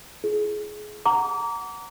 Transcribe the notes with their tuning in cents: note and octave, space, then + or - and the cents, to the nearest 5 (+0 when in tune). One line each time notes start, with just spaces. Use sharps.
F4 -40 G#4 +25
F#5 +0 A#5 -10 D6 -30